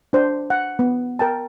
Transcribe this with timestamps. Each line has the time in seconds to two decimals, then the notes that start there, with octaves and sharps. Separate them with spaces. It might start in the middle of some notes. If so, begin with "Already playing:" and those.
0.13 D4 C5
0.50 F#5
0.79 B3
1.19 A#4 G5 A5